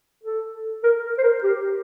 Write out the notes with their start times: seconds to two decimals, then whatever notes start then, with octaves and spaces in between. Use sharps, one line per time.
0.23 A4
0.83 A#4
1.18 C5
1.23 A#4
1.43 G4